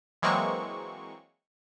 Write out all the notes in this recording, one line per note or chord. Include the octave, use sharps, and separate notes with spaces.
E3 F#3 G#3 A#3 C4 C#6